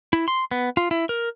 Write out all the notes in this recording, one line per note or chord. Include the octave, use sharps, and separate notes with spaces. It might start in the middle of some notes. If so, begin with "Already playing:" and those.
E4
C6
B3
F4
E4
A#4